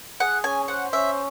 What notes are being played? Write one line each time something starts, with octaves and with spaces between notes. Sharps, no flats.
G#4 F#5
C#4 G#5
C5 F#5
C#4 E5